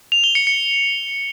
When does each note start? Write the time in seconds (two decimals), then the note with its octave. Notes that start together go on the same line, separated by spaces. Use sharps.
0.12 F7
0.24 G7
0.35 C#7
0.47 C#7